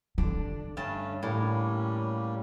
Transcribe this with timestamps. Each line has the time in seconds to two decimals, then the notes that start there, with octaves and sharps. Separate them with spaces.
0.18 D3 D4
0.77 G2 A3 C#4 A5
1.23 A2 G3 A#3 C#4